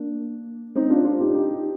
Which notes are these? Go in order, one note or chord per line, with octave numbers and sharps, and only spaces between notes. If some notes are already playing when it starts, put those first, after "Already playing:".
Already playing: A#3 D4
C4 D#4
D4 F4
D4 F4
D#4 G4
D#4 G4